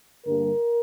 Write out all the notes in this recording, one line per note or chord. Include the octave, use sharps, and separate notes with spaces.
G2 D3 G3 A#3 D4 A#4